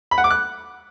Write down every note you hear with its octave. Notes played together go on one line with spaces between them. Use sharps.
B5
F#5
D6
F#6